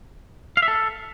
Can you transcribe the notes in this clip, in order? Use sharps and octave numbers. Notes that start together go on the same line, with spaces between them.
F5
E5
A4